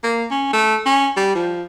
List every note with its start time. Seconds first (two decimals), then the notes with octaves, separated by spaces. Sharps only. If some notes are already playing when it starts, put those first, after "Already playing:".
0.04 A#3
0.31 C#4
0.53 A3
0.86 C#4
1.17 G3
1.35 F3